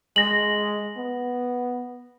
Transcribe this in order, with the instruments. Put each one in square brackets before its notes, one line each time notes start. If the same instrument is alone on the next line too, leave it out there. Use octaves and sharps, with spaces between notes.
[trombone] G#3 [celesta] A#6 F#7
[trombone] B3